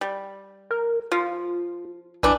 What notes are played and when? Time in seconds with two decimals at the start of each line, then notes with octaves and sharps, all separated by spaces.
0.01 G3
0.71 A#4
1.12 F3 F4
2.23 B1 E3 D4